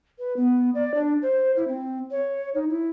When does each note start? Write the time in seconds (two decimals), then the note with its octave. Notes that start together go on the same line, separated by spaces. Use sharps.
0.19 B4
0.37 B3
0.75 D5
0.94 D4
1.22 C5
1.56 E4
1.68 C4
2.11 C#5
2.55 D#4
2.69 E4